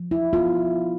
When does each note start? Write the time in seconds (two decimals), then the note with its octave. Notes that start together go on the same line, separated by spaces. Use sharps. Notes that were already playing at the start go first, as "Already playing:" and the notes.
Already playing: F3
0.11 E4
0.33 B3 F4